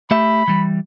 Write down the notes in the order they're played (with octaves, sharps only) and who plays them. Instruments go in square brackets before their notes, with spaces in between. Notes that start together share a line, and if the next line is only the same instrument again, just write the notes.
[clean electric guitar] A3 G4 E5 [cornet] B5
[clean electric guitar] E3 G3